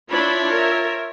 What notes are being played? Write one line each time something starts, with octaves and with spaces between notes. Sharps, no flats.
D4 E4 F4 C#5 B5
A#4 E5